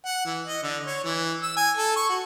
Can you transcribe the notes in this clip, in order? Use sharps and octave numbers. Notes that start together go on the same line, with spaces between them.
F#5
E3
D#5
D3
C#5
E3
E6
G#5
A4
C#6
F#4